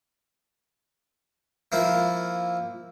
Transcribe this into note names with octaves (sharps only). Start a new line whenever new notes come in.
F3 A#3 E4